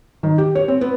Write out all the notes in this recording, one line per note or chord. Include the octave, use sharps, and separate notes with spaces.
D#3
G4
C#5
C4
B3